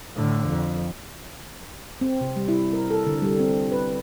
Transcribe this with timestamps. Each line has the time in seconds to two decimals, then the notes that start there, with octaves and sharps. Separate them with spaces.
0.16 A2 D3
0.48 F2
2.01 C4
2.21 C3
2.36 G3
2.48 E4
2.73 A#4
2.90 A4
3.07 D3
3.22 G3
3.40 C4
3.72 B4